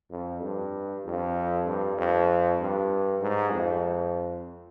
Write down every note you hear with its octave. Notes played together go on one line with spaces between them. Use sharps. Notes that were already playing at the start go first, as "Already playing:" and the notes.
F2
G2
F2
G2
F2
G2
G#2
F2